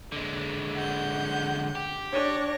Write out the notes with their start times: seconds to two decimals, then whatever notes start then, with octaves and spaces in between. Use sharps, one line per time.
0.12 D3 G#3
0.74 F#5 G6
1.75 G4
2.11 D4 C#5 A#6